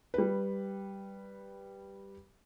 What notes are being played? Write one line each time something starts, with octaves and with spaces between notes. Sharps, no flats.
G3 B4